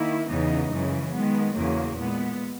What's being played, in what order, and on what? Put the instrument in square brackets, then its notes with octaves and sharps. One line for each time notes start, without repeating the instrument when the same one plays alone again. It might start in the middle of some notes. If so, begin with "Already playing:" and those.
Already playing: [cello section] D#3 A#3 E4
E2 C#3 E3 B3 D#4
F#2 C#3 E3 G#3
D#3 G#3 B3
E2 C#3 F#3 A#3
A#2 G#3 B3